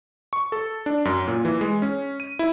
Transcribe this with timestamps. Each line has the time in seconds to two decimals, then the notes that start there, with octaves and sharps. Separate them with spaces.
0.33 C#6
0.52 A4
0.86 D4
1.05 F#2
1.28 A#2
1.45 E3
1.61 G#3
1.82 C#4
2.20 D#7
2.39 E4